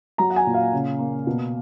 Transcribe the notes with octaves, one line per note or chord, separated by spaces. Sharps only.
F#3 A#5
F#5
G#5
A#2
F5
C#3
A#3
B2